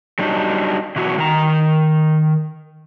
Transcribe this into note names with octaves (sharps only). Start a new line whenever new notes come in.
F#3 G3 D4 D#4
B2 E3 F#3 F#4
D#3 A#5